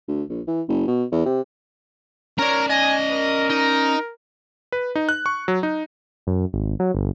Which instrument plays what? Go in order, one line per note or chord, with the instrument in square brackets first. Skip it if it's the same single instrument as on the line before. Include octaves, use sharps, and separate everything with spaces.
[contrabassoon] D2
A#1
E3
F#1
B2
E2
C3
[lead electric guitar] C#4 D5 [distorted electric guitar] A#4 A#5 [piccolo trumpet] C#5
[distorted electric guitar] D#5 [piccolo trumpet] G#5
[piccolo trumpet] A#4
[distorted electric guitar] D#4
[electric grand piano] B4
D#4
F#6
C#6
F#3
D#4
[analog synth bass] F#2
G#1
F#3
G1